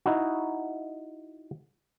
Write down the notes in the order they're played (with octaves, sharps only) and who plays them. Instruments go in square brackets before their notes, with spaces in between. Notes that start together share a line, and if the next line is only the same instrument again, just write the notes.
[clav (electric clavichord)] D#4 E4 F#4